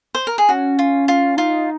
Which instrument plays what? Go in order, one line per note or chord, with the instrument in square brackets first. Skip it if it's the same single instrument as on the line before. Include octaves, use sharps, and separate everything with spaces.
[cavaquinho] C5
A#4
G#4
[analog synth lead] C#4 [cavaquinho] F#4
[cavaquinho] F4
F4
[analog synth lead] D#4 [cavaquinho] F4